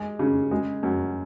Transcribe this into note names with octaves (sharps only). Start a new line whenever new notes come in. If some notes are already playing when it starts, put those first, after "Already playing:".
Already playing: G#3
C#3
G#3
F#2